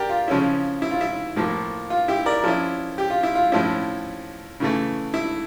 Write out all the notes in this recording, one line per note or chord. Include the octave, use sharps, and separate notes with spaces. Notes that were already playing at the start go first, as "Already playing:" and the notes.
Already playing: G4 A#4 D5
F4
C#3 F3 C#4 E4
E4
F4
E4
A2 F3 A#3
F4
E4 G4
A#4 D5
F3 C#4 E4
G4
F4
E4
F4
A2 F3 C#4 E4
C#3 E3 A3
E4